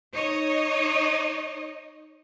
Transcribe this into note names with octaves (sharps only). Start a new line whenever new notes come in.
D#4 C#5 D#5